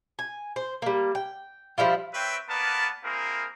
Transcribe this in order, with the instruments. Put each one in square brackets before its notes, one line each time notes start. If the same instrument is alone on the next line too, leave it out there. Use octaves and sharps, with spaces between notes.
[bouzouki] G#5
C5
G3 A#3
G5
F3 G3 E4 F4
[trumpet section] C4 B4 C#5 E5 G5
A#3 B3 A#4 B4 D5 A5
A#3 C4 E4 G#4 A#4